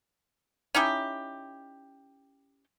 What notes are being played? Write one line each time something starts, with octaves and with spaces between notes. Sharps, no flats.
C#4 D#4 E4 G4